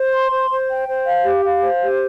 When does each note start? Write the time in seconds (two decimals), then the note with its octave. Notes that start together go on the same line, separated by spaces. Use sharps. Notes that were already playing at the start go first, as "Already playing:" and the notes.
Already playing: C5
0.12 C6
0.31 C5
0.50 C5
0.69 G5
0.87 C5
1.06 F5
1.24 G4
1.44 F5
1.63 C5
1.81 G4